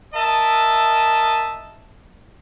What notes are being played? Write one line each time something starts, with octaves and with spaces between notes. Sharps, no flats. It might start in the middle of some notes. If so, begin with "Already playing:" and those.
A#4 D#5 E5 A5